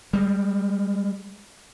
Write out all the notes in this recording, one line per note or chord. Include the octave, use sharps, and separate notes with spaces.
G3 G#3